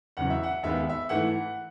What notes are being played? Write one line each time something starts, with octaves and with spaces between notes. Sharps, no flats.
E2 C#3 F#3 F#5
E5
F#5
D#2 D#3 G#3 B3 E5
E5
G#2 E3 A3 F#5